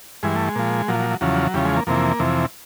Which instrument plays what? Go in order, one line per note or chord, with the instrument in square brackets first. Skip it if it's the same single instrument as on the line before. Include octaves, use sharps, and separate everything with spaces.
[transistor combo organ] G2 E3 G#3
A3
G#3
A#2 F3
A#2 F3 F#3
F#3
F#3
E2 C#3 F3 F#3
E2 C#3 F3 G3
G#3
A#3
F2 C3 E3 A#3
F2 C3 E3